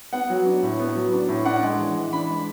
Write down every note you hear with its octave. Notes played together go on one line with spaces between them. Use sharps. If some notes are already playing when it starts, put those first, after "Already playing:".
B3 F#5
F#3
D4
A2
B3
F#3
D4
A2
D4 F#5
G#3
E3
E3
D4 B5
G#3